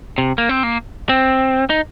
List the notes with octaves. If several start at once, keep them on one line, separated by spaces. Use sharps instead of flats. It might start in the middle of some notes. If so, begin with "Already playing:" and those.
C3
A#3
C4
A#3
C4
D#4